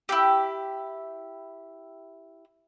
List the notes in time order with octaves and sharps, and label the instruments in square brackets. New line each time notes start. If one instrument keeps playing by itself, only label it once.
[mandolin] E4 F4 G4